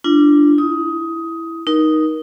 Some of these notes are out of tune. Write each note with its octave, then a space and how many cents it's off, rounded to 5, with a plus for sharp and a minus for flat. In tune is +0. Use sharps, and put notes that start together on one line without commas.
D4 +0 F4 -35
E4 +0 D#6 +15
D#4 +0 A#4 +25